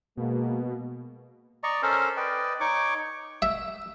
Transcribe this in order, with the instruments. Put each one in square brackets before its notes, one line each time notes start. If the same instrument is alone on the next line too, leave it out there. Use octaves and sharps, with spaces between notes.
[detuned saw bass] B2 [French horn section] G#3 A#3
[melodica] D5 D#5 A#5 C#6
C#4 A4 A#4 C5
B4 D5 D#5 G5
D#4 C#5 C#6 D6
[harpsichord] E5